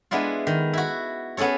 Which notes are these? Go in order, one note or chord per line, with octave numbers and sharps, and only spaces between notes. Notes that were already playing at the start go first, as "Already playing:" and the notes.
G#3 B3 D4 E4 F4
D#3
E4 F#4
B3 C#4 G#4 A4 C#5